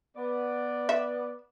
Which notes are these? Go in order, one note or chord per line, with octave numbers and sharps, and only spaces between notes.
B3 D5
E5